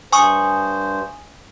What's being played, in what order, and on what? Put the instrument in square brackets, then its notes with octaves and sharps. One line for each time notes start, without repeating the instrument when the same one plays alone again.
[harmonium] G2 C5 [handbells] G#5 C#6 D#6